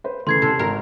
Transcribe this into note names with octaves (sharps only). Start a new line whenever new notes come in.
B4 C5
C#3 E3 A3 C6 G#6 C7
E2 C3 A4
G#1 A#4